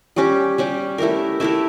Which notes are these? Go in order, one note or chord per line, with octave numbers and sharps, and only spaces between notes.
G3 C#4 G4
G3 C#4 G4
A3 E4 G4 A#4
A3 E4 G4 A#4